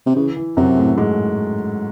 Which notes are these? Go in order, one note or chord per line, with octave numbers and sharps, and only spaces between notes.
C3
C#3 E3
E3
F#2 C3 F#3
A2 A3
G#2 G#3